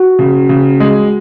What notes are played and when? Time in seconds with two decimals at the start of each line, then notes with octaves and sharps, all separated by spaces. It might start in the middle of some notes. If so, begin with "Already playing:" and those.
Already playing: F#4
0.19 C#3
0.49 C#3
0.80 G#3